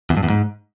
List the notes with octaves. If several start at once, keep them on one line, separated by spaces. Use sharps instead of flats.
E2
G2
E2
G#2